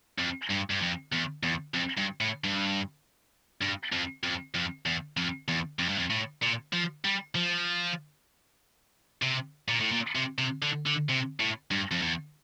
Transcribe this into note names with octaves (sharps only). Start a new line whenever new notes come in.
F2
G2
G2
F2
E2
E2
F2
G2
A2
G2
G2
F2
F2
F2
E2
F2
E2
F2
G2
F2
A2
A#2
F3
G3
F3
C3
A#2
A2
A#2
C3
C3
D3
D3
C3
A2
G2
F2
E2